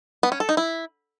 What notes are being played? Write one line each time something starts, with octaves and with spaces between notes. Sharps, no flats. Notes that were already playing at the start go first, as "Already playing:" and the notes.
B3
C#4
A4
D#4
E4